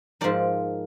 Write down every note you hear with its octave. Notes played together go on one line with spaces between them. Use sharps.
G#2 F3 A#3 D#4 D5